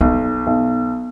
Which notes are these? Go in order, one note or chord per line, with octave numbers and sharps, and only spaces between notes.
B1 B3
B1